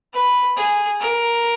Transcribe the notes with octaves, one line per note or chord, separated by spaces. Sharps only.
B4
G#4
A#4